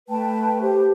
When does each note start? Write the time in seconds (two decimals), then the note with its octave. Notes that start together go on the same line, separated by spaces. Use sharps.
0.09 A3 B4 G5 A5
0.62 G4 C5